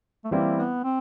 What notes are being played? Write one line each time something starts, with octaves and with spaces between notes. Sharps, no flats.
A3
E3 G3 A#3 C4 E4
B3
C4